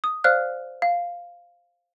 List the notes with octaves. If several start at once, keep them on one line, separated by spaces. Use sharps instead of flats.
D#6
C5 D5 F5 F6 F#6
F5